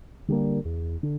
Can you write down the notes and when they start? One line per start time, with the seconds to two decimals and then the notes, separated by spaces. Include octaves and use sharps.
0.28 D3 G3 A#3
0.65 E2
1.03 D3